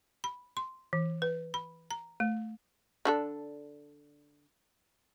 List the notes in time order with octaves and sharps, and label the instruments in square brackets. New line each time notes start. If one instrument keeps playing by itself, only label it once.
[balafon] B5
C6
E3
B4
B5
A#5
A3
[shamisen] D3 D4 A4